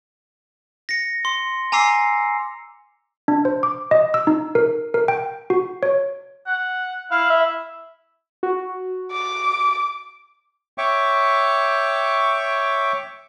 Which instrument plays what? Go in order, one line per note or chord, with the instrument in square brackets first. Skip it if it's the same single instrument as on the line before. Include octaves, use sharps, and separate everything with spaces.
[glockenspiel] A#6 C#7
C6
G#5 A#5 D6 E6 C7
[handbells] D4
C5
D6
D#5
E6
D#4
A#4
A#4
G5
F#4
C#5
[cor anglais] F#5
[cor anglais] E4 [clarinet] F5
[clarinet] E5
[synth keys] F#4
[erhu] D6
[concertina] C#5 E5 G5 C#6 D6